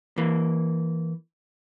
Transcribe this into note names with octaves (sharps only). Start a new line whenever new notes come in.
E3 A#3